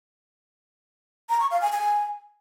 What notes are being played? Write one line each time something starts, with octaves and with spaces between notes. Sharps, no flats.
A#5
C#6
F5
G#5
G#5